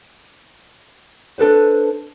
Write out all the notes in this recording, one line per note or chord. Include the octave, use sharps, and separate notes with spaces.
D4 A4 B4 C5